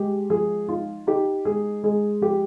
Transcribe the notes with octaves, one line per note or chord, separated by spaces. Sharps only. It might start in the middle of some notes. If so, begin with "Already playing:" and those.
Already playing: G#3 G4
F3 G#4
D#4 F4
D#4 G4
G#3 G#4
G#3 G#4
F3 G4